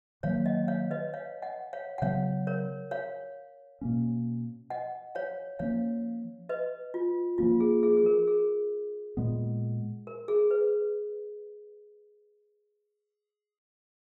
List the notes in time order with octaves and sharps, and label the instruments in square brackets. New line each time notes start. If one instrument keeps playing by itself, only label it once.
[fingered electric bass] D#3 F#3 A#3 [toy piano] C#5 F5
[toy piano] D#5 F#5
C#5 F5
B4 D#5
C#5 F5
D#5 F#5
C#5 F5
F#5
[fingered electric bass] C#3 F#3 B3 [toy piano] C#5 F5
[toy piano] A#4 C#5
C#5 F5
[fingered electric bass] B2 A#3 C#4
[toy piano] D#5 F#5
C#5 F5
[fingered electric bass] F3 A#3 C#4 [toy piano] C#5 F5
[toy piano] B4 D#5
F4
[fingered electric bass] F3 A#3 C#4 [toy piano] F4
[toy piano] G#4
G#4
G#4
A#4
G#4
[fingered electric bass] A#2 G#3 B3
[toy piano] A#4
G#4
B4